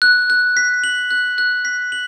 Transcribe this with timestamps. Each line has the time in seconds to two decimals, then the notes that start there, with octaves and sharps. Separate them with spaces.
0.02 F#6
0.30 F#6
0.57 B6
0.84 F#7
1.11 F#6
1.38 F#6
1.65 B6
1.92 F#7